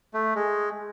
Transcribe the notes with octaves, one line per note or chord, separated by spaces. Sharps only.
A3
G#3